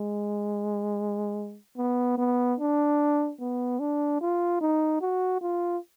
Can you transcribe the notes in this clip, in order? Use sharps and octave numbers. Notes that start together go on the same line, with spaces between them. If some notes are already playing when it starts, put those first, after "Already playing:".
Already playing: G#3
B3
B3
D4
B3
D4
F4
D#4
F#4
F4